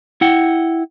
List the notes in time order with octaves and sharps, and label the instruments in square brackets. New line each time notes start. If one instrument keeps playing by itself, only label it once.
[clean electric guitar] E4 F#5 G5